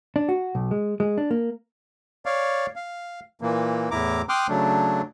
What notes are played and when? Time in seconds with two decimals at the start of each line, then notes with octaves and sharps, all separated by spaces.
0.16 D4
0.29 F#4
0.55 B1
0.71 G#3
1.00 G#3
1.18 D4
1.31 A#3
2.26 C#5 D5 F5
2.76 F5
3.41 A#2 E3 A#3
3.91 E2 A2 E4 A#5 D6
4.29 G5 C6 D6 D#6 F6 F#6
4.49 C#3 F#3 A3 D4